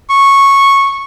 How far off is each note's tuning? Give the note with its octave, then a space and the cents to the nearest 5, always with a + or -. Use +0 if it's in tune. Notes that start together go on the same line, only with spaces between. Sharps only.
C#6 -10